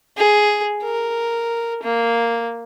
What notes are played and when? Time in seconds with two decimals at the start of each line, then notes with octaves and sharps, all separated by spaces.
0.17 G#4
0.83 A#4
1.83 A#3